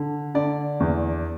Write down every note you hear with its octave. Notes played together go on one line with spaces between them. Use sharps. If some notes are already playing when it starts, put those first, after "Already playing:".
Already playing: D3
D3 D5
E2